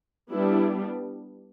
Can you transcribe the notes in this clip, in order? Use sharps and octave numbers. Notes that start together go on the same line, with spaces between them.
G3 B3 D4 E4